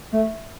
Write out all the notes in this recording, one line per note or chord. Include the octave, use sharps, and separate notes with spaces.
A3